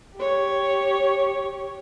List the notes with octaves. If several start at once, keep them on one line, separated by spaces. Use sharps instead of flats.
G4 C#5